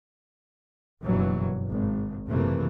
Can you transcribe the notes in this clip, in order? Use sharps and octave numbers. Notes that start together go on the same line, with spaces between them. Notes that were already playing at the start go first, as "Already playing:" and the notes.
F#1 G2 B2 E3 F#3
G#1
F#1 F2 C3 E3 A3 A#3